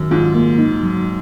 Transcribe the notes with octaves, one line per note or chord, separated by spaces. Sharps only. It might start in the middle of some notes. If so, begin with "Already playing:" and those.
Already playing: F#2 D#3
G#2 F4
A#3
D#4
F#3